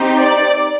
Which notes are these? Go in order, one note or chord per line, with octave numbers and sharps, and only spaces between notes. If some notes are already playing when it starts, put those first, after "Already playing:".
Already playing: C4 D#4 G4
D5